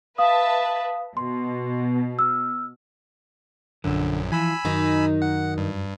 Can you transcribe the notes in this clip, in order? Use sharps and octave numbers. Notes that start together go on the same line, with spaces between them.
B4 E5 F5 A5 D#6
B2 C6
E6 F6
A#1 F#2 D3
E3 F3 G#5 B5 E6
F#2 D#3 D#4
F#5
G2